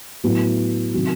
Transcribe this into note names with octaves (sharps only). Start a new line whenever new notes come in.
A2 F#3 B3 E4
C3 D#3 F#3